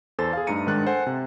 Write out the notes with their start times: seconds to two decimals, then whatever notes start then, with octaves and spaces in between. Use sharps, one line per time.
0.19 E2 A4 C5 A6
0.33 G#4 F5
0.47 G2 A3 D#4 A#5 C#7 D#7
0.67 G#2 D#3 G#3 D4 F#6 A6
0.86 A4 C5 F#5 G#5
1.07 C3